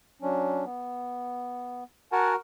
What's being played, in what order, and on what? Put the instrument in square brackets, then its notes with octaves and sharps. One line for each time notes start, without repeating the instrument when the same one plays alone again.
[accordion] F#3 C#4 D4
B3
[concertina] F#4 A#4 [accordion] F#5 G#5 A5